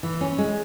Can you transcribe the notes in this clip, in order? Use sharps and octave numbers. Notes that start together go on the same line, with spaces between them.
E3
C#4
G#3